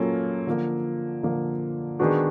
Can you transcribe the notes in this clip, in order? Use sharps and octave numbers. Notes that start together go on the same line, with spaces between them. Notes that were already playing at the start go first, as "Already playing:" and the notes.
Already playing: F#3 A#3 C#4 F4 A4
D3 F3 A#3
D3 F3 A#3
D#3 G#3 B3 D4 F#4